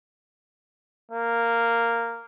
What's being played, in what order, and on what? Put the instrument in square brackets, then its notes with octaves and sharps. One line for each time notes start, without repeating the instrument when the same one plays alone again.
[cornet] A#3